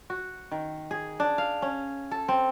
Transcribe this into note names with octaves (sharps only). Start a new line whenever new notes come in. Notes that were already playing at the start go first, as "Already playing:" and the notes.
F#4
D#3
G#4
D4
F5
C#4
A4
C4